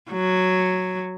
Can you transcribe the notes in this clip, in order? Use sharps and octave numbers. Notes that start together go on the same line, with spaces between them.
F#3